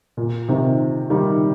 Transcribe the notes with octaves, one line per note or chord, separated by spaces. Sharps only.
A#2
C3 D#3
D#3 G3